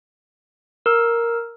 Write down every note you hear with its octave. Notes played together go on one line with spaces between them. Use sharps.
A#4 E6